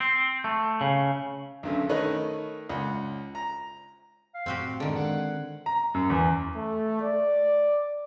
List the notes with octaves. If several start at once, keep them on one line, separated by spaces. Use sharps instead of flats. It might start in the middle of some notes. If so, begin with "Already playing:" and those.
C4
A3
C#3
B1 F#2 D3
D#3 A3 B4 C#5 D#5
C#2 F#5
A#5
F5
F#2 A2 C4 F#4 G4
D3 D#3 G#3
G#3 C4 D4 F#5
A#5
F#2
E2
A3
D5